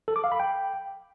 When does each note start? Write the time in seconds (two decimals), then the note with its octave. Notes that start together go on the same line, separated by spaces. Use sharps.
0.08 A4
0.16 D6
0.24 F5
0.32 B5
0.40 G5